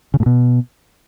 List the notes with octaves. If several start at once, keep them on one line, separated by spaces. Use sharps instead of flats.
C#3
A2
B2